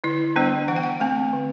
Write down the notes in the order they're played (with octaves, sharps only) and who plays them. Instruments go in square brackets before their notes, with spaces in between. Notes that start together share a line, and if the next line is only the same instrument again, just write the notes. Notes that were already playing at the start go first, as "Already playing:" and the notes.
[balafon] D3 E4
G3 B3 D4 C5
E3 F#5
G5
F#5
A3 C4 A5
D3